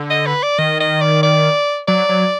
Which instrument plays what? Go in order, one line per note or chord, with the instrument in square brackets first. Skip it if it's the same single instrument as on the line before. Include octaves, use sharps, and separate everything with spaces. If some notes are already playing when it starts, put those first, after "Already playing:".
Already playing: [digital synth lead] D3
[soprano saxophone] D#5
B4
D5
[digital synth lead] D#3 [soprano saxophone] D#5
[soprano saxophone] D#5
D5
D5
[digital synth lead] F#3 [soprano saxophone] D5
[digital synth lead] F#3